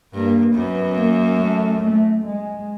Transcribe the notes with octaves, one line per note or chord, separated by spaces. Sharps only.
G2 A#3
F#2 B3
A#3
A3
A3
G#3